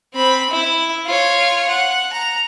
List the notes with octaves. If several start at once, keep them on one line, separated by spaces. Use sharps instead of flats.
C4 B5
E4
F4 C#5
F#5
A#5